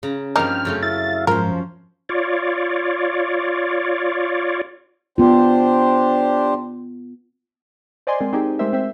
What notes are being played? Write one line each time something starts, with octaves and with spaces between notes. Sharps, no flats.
C#3 A#5
G2 F3 A#3 C4 D#4 G5 F6
F#2 C#3 A3
E4 E5 F5 A6
G#2 F3 C#4 A#4 C5
F4 C#5 D5
B3 D4 F4 G4 C5
C5 D5 D#5 G#5 C6
G#3 C4 A#4
C4 D#4 G4 G#4
G#3 A3 G4 A#4 C5 E5
G#3 C4 C5 E5